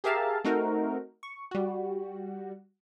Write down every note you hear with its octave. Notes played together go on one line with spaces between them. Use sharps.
G4 G#4 A#4 E5 F5 A5
A3 C4 D#4 F#4 A#4
C#6
G3 F#4